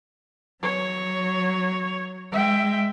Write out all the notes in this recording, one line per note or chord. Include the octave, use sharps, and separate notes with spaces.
F#3 C#5
G#3 E5 G5